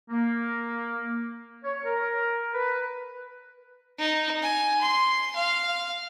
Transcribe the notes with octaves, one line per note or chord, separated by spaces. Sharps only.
A#3
C#5
A#4
B4
D#4
G#5
C6
F5